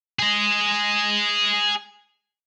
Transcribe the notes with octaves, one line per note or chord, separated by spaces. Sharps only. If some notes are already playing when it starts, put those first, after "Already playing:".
G#4 D#5